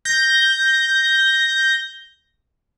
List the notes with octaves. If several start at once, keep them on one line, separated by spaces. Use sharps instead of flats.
G6 A#6